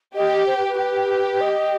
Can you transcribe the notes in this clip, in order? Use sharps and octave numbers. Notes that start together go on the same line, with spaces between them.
G4 D#5
C5
B4
B4
G4
D#5